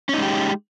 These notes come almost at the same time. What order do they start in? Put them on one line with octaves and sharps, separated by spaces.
C#4 D#4 G#3 G4